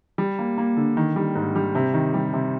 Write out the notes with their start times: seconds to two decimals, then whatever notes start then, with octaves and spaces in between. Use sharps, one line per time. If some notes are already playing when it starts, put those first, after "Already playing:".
0.18 G3
0.39 A#3
0.58 A#3
0.77 D3
0.97 D#3
1.16 G3
1.35 G#2
1.56 G3
1.75 C3
1.94 D#3
2.14 G3
2.33 C3